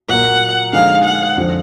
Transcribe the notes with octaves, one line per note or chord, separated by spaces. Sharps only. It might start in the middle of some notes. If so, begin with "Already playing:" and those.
A#2 F#3 A#3 F#5
D3 F3 G#3 D#4 G#4 F5
F#5
F2 D3 F3